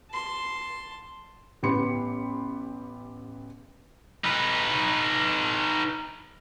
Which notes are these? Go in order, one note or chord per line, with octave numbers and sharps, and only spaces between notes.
A5 C6
A1 B3 G4 B5 C6 C#7
D#4 B4